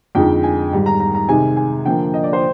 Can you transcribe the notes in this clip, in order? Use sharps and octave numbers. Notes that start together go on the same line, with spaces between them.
F2 D3 G#3 D#4 G5
G#5
G#2 D#3 G3
A#5
A#5
A#5
C3 D#3 G#3 D#4 G#5
G#5
D3 F3 A#3 G5
D#5
D5
C5